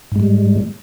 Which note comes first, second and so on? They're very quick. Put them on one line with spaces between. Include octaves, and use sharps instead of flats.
G#2 G#3 G3